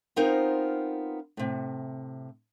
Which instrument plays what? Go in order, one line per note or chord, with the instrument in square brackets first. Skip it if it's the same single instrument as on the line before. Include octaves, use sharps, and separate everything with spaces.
[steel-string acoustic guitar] B3 C4 D#4 F4 A#4 C5
A2 C3